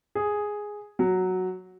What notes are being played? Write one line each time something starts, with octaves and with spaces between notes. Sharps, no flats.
G#4
F#3